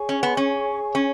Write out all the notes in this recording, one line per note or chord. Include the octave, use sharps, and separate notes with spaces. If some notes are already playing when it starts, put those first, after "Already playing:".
Already playing: G#4 C#5 G#5 C#6
C#4
B3
C#4
C#4